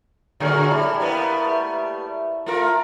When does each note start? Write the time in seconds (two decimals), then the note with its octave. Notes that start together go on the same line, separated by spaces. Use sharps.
0.40 A2 D3 F#3 G#4 A#4 C#5
0.71 G3 E4 A4 A5
1.00 G3 A#3 B3
1.45 A3
2.46 A3 F4 A#4